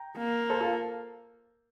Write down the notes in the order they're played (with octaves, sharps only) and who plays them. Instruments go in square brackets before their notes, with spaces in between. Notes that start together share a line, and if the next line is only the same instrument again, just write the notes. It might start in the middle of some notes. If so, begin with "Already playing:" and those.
Already playing: [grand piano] G5 A#5
[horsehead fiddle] A#3
[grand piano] A4 C5
F4 A4